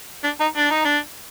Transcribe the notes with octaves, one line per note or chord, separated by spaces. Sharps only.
D4
D#4
D4
D#4
D4